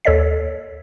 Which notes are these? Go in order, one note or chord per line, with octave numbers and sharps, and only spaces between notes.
D#2 A4 C#5 D#5 B6